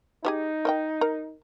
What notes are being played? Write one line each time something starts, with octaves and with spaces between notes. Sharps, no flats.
F3 D#4 G4 G#4
A#4 D#5 G5
A#4